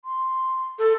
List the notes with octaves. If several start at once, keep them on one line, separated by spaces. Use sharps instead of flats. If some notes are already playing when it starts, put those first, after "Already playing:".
C6
A4